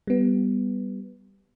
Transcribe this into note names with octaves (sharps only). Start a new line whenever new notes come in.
G3 B3